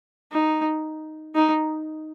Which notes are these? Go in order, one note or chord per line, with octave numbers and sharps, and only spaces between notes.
D#4
D#4